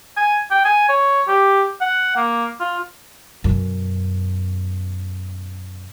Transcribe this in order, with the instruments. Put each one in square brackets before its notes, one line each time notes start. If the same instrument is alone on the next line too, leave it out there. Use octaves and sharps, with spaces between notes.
[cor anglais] G#5
G5
G#5
C#5
G4
F#5
A#3
F4
[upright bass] F#2 B2